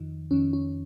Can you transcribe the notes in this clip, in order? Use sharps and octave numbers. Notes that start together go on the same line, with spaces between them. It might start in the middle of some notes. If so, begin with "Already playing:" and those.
Already playing: F2 D#3
F2 D#3 C#4
C#4